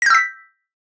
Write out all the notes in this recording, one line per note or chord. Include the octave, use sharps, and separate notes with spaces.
E6 G6 A#6 B6